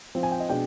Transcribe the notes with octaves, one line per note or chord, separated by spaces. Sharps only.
F3 C4
G#5
G5
D#5
B2 G#3 D4 G5